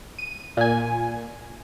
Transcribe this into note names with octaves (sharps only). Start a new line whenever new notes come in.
D#7
A#2 G#5